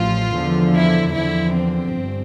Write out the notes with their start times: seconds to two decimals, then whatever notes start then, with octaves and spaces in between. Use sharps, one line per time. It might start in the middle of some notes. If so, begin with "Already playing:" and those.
Already playing: A1 A2 F3 F4
0.33 E2 D3 F3
0.73 E4
1.12 E2 D3 F3 E4
1.51 C4
1.90 G1 G2